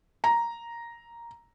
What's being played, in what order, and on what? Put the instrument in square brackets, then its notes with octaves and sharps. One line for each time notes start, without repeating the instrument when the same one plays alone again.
[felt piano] A#5